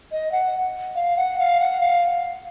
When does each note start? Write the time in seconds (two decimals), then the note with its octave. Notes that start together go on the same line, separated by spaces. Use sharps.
0.12 D#5
0.32 F#5
0.95 F5
1.17 F#5
1.39 F5
1.60 F#5
1.81 F5